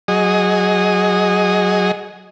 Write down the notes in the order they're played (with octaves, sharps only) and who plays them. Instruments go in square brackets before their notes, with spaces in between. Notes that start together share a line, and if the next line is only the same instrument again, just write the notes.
[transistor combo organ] F#3 G#4 D#5